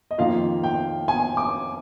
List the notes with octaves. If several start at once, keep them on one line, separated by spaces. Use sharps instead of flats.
D#5
F2 D#3 A#3 F4 F5
G5
G#5
D6